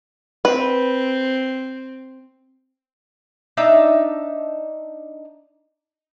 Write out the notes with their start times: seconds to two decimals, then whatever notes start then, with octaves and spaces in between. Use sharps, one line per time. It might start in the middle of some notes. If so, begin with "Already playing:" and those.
0.45 C4 B4
3.57 D4 D#4 E5 A5